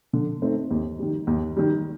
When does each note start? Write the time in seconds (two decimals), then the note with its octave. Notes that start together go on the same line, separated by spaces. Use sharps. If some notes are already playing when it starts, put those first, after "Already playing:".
0.13 D3
0.42 A3 C4 D#4
0.71 D#2
0.99 D#3 G3
1.27 D#2
1.56 D#3 G3